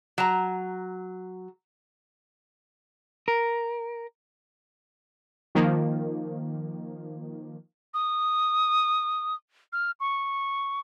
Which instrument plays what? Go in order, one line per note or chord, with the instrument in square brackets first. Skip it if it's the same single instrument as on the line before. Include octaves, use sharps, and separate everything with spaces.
[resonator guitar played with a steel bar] F#3 A#5
[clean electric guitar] A#4
[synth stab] D#3 F3 A#3
[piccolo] D#6
F6
C#6